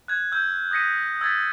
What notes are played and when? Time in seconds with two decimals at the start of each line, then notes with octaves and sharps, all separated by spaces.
0.08 F#6 G#6
0.32 E6 G6
0.71 D#6 G#6 A#6 B6 C#7 D#7
1.21 E6 G#6 A6 B6